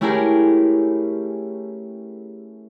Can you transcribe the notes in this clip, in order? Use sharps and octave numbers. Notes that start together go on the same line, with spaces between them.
A3 C#4 E4 G4 G#4 A#4